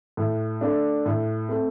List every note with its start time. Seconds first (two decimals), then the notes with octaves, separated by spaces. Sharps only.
0.17 A2
0.61 A3 D4
1.06 A2
1.49 A3 C4